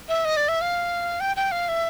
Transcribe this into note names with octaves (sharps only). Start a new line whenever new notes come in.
E5
D#5
D5
E5
F5
G5
G5
F5
E5